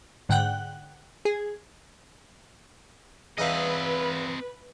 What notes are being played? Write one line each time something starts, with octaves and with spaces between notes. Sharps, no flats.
G#2 D3 F#5 G5 F#6
G#4
E2 C4 D#4 B4 D#5 F5